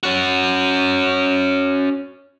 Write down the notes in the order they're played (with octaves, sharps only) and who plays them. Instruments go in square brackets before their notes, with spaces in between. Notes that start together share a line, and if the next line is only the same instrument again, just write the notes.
[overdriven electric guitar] C#4 F#4